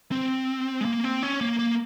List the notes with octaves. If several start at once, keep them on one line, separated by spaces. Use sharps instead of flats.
C4
G#3
A#3
C4
C#4
A#3
A#3